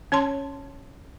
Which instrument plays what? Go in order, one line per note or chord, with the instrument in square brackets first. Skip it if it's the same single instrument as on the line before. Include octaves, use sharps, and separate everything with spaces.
[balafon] C#4 C#5 A5 C6